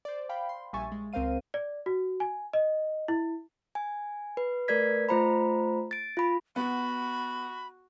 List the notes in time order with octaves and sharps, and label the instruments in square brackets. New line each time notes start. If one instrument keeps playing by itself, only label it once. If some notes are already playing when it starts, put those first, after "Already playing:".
[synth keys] C5 D5
F5 G5 B5
C6
A#1 G3 E5 G#5 C#6 A6
G#3
C#2 C4 A#4 C5 F5 D#7
[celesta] D5
F#4
G#5
D#5
E4
[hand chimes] G#5
B4
A3 A#4 B4 D5 G#6 B6
A3 F4 C5 A#5 B5
A6 D7
F4 B5
[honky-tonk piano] B3 [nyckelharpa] F#4 [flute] B5